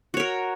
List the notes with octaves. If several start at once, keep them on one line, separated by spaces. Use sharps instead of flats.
F#4 A#4 C#5